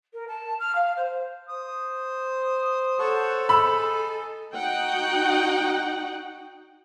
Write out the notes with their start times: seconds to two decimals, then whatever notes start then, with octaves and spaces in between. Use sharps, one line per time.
0.13 A#4
0.28 A5
0.59 F6
0.75 F5
0.97 C5
1.49 C5 D#6
2.99 A4 C#5 F#5 A5
3.49 D#4 G#4 B5 E6
4.54 D#4 F#4 F#5 G5